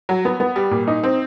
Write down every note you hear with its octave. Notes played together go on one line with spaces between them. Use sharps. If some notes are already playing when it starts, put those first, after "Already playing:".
F#3
B3
B3
G3
A#2
D#4
C4